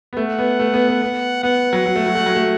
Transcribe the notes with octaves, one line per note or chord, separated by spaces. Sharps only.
B3
A3 F#5
B3
A3
B3
B3
B3
B3 F#5
F#3
F#3
A3
F#3
A3
F#3
A3